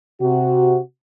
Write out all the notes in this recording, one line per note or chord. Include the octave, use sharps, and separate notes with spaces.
C3 F#4